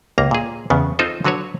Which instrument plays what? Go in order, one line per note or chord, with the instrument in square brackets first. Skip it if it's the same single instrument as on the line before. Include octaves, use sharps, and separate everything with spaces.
[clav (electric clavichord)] C#2 A#3 A#5
A#2 G#4
E2 C#3 B3
C4 D#4 F4 A4 C5
D3 F#3 F#4 B4 C#5